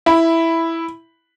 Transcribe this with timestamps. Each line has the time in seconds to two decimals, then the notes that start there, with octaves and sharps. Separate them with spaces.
0.06 E4 B5